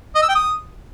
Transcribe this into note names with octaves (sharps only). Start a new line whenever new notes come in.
D#5
E6
G5
D#6